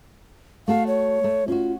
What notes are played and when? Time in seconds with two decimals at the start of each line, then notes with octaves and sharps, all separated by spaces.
0.68 A3 F#4 A4 F5
0.87 C#5
1.24 A3
1.48 C#4 F4 F#4